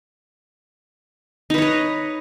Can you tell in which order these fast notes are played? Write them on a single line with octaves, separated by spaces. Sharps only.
D#4 B4 C#5 D#5